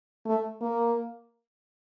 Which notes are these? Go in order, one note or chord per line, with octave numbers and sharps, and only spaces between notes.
A3
A#3